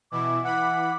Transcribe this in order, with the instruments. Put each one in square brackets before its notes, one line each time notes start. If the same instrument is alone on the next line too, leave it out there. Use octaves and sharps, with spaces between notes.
[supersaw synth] B2 E3 E4 [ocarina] D6
[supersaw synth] E3 B5 [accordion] F#5